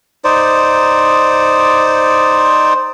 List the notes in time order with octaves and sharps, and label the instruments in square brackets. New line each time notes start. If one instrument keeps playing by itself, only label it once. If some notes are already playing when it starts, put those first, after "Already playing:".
[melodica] D#4 C5 D5